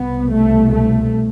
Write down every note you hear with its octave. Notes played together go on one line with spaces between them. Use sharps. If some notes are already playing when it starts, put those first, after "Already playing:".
Already playing: C2 B2 B3
A3
A3